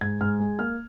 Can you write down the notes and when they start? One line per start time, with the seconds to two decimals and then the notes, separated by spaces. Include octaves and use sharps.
0.01 G#2 G#6
0.21 G#2 F6
0.40 G#3
0.59 A#3 F6